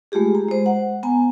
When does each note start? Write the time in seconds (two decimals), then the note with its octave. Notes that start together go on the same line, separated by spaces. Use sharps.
0.12 G#3 A3 F4 G4 G#4
0.35 A#5
0.48 G#3 C5
0.66 F#5
1.03 B3 G#5 A#5